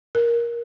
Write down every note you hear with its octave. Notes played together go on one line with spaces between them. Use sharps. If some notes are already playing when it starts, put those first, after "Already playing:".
A#4